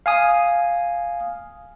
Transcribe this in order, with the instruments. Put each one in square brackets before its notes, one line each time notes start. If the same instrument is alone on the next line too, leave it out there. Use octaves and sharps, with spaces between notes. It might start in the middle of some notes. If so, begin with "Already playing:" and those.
[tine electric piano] F5 G#5 D#6